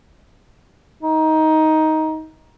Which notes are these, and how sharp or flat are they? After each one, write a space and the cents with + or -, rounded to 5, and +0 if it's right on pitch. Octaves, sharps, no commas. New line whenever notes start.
D#4 +15